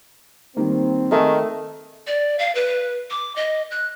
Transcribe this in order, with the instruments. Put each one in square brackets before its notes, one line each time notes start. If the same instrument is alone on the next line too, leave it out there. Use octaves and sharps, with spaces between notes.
[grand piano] D#3 G3 A#3 [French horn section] C4
[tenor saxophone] D#3 [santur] A3 E5 [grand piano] G#4 G#5
[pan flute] D5
F5
B4
D6
D#5
F#6